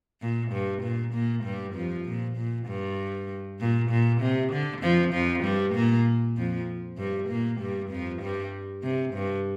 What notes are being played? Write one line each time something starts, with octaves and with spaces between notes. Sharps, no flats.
A#2
G2
A#2
A#2 A#3
G2 G3
F2 F3
A#2
A#2
G2
A#2
A#2
C3
D3
F2 F3
F2 F3
G2 G3
A#2 A#3
F2 F3
G2 G3
A#2 A#3
G2 G3
F2 F3
G2 G3
C3
G2